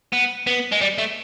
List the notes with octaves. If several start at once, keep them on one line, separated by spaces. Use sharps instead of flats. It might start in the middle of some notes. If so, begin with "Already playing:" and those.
B3
B3
G#3
G3
A3